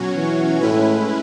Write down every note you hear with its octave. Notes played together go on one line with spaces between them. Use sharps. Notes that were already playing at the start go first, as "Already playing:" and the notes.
Already playing: B2 F#3 C#4 F#4 C#5
E3
A2 G#3 C#4 E4 B4